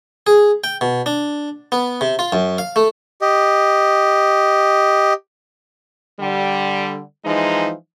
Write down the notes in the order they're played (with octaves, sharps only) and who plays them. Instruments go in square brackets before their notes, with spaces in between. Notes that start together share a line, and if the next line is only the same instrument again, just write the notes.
[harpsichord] G#4
G5
B2
D4
B3
C3
F4
F#2
F5
A3
[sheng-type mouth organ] G4 D#5
[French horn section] D3 G3
E3 F3 G#3 D#4